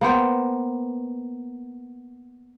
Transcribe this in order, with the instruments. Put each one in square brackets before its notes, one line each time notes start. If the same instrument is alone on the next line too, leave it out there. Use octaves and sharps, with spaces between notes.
[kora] A#3 B3 C5 G5